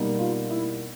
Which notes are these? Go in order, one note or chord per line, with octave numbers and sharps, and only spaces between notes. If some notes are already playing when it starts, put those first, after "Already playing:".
Already playing: B2 G3 A#3 D#4
F4
E4